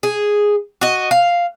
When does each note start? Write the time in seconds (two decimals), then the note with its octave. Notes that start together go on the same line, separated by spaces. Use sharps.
0.03 G#4
0.81 F#4 D#5
1.11 F5